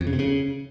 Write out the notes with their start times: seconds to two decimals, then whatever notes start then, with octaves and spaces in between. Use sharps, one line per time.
0.01 F2
0.07 C#3
0.13 C3
0.19 C#3